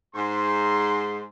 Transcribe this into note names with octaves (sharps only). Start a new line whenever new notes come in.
G#2 C6